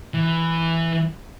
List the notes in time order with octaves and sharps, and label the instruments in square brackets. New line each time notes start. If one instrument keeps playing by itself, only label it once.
[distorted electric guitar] E3